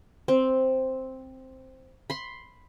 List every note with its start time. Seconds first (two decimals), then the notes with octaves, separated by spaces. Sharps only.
0.28 C4
2.10 B5 C6